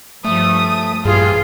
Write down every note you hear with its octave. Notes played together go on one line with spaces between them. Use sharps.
G2 F3 G3 A3 D#6
A#1 G2 E3 G3 F4 G#4